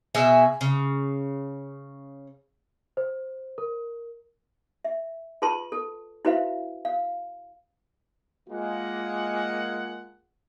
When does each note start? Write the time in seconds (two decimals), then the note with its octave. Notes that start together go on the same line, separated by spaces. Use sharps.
0.15 B2 G#4 E5 G#5
0.61 C#3
2.97 C5
3.58 A#4
4.85 E5
5.42 F4 G#4 B4 A5 C6
5.72 A4
6.25 E4 F#4 B4 C5 E5 F5
6.85 F5
8.49 G#3 A#3 F4 F#5